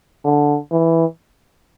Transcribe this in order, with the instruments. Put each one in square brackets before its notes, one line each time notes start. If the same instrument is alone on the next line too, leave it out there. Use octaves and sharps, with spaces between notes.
[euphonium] D3
E3